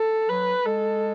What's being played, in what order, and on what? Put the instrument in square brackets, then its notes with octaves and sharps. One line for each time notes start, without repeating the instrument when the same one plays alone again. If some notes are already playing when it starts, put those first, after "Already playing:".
Already playing: [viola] A4
[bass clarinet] F#3 [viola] B4
[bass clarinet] G#3 [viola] A4